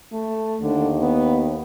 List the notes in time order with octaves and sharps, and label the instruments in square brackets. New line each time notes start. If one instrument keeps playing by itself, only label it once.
[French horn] A3
[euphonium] D#2 [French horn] D3
[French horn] B3